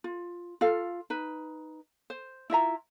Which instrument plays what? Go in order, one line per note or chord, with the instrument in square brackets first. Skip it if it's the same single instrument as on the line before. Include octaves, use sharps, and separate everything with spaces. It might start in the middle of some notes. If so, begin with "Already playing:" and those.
[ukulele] F4
F4 A4 F5
D#4 B4
C5
E4 F4 E5 A#5